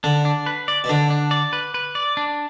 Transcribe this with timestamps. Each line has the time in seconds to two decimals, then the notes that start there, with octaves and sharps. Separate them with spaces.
0.04 D3 D4
0.25 D4
0.46 B4
0.68 D5
0.84 B2
0.89 D3 D4
1.10 D4
1.31 D5
1.53 B4
1.74 B4
1.95 D5
2.17 D4